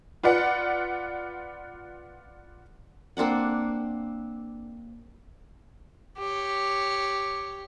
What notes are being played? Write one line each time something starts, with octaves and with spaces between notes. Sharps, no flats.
F4 B4 D5 F#5
A#3 C4 D4 F#5
G4 C#5